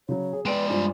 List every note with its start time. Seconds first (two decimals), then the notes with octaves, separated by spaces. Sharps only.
0.09 C#3 F#3 C#5
0.33 G#4
0.45 G#3 B4 D5 G5 D7
0.70 G2 F4 C5